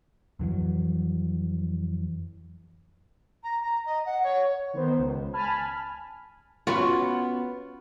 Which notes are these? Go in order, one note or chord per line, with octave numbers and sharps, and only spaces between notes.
F2 E3 F#3
A#5
A#5
D#5
F#5
C#5
D#3 B3 C5
C#2
G#5 A5 B5 F6
B3 C#4 F4 F#4